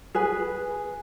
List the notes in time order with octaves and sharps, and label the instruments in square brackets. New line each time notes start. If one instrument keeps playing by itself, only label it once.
[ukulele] G#4 B4 G#5